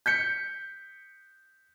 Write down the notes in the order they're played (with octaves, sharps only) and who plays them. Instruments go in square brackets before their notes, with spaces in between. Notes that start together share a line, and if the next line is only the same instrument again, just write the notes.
[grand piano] G6 B6 C#7